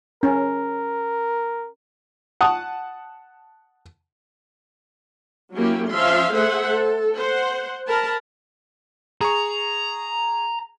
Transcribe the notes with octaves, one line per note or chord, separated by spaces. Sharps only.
C#4 A#4
F#5 A5 D#6
F#3 A#3 C#4 E4 G4
F3 C#4 E5 F5 C6
A3 G#4 C5 E5 F#5
A4
C5 F#5
A#4 A5 B5
G#4 A#5 C#6